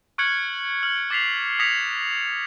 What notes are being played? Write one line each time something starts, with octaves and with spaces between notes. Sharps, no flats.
C#6 F6 F#6 G#6 C#7 F#7
F6 F#7
D6 A6 B6 C7 F7
D#6 G#6 A#6 B6 C#7 F7